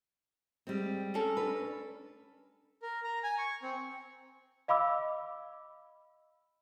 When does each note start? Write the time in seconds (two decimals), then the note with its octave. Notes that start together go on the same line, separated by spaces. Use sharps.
0.67 G3 G#3 C4
1.14 C#4 A4 A#4
1.37 D4 B4
2.82 A#4
3.04 A#5
3.24 G#5
3.38 C#6
3.63 C4
4.68 D#5 F5 B5 D6 E6